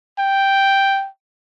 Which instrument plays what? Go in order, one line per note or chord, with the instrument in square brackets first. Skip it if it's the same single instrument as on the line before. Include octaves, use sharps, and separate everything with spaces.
[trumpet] G5